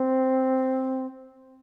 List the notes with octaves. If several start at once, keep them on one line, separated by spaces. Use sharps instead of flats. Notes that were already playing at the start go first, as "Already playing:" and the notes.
Already playing: C4